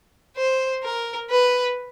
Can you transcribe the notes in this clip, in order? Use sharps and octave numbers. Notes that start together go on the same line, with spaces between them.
C5
A#4
B4